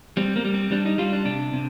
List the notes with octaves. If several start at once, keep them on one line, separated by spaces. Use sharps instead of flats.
G3 C4
A#3
G3
C4
G3 D4
D#4
G3 F4
D4
C3 D4
C3